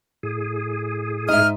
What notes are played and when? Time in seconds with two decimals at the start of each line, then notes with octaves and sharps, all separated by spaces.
0.23 A2 G#4
1.29 G#2 D#5 E5 F6